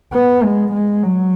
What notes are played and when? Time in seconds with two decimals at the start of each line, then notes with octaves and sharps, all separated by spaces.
0.13 B3
0.43 G#3
0.73 G#3
1.03 F#3